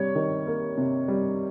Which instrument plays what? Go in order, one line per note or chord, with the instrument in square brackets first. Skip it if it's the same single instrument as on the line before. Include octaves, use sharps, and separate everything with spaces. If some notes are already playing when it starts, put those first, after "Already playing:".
Already playing: [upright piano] C3 G3 [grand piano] C#5
[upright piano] D#3
A#3
C3
G3